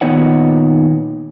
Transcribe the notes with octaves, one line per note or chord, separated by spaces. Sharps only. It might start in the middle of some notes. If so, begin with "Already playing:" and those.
A#2 D#3 B3 D#4 C#5 F#5